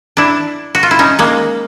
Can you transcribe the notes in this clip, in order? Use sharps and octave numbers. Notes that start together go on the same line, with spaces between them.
D4 E4
F#4
F4
E4
C#4 D#4
G#3 A#3